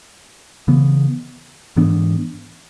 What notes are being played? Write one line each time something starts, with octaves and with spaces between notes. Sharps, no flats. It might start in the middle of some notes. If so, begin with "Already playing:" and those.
C#3 E3 B3
G#2 E3 B3 D4